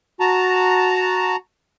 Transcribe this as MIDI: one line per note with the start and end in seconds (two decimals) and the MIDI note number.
0.20 1.36 66
0.20 1.36 81
0.20 1.36 82